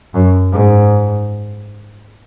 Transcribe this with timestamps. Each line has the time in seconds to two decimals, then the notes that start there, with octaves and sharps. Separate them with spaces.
0.15 F#2
0.53 G#2